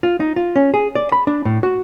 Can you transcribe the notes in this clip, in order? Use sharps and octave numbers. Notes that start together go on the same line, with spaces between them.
F4
D#4
F4
C#4
G#4
D5
B5
D4
A2
F#4